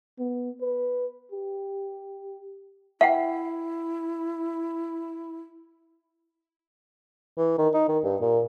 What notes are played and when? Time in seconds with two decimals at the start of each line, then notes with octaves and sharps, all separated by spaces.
0.19 B3
0.61 B4
1.32 G4
3.01 E4 B4 E5 F#5 G5
7.38 E3
7.58 D#3
7.74 D#4
7.89 D#3
8.04 G2
8.21 A#2